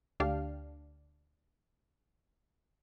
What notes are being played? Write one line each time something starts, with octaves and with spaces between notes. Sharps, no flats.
D2 D4 G4 F5